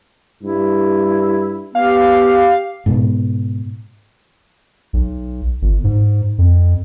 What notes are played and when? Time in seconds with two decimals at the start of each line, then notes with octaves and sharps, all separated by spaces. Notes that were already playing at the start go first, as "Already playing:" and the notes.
0.43 G2 E4
1.75 B3 G4 F5
2.86 G#2 B2
4.93 B1
5.62 G1
5.84 G#2
6.38 F2